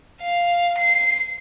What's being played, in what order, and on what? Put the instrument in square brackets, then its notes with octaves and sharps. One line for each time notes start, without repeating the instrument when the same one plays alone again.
[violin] F5
C7